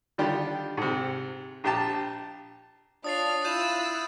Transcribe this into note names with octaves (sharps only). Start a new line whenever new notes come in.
D3 D#3 G3 F4 G4
G#2 C3
A#1 G4 A5
D4 F4 C#5 D#6 A6 C7 F7
E4 F4 E6 F#6 G6 D#7 E7